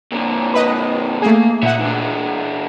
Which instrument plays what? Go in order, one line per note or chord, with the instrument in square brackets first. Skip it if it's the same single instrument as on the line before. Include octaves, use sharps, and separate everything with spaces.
[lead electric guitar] A#2 D3
[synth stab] B4 D#5
[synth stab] A3 G#4 [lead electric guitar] A#3
[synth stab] A#2 F#5 [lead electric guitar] D#4 E5
[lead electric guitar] E3 D4